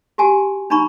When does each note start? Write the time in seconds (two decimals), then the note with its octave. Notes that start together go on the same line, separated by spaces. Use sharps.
0.18 F#4 G4 G#5 A5
0.70 D4 D#4 A#5 B5 C#6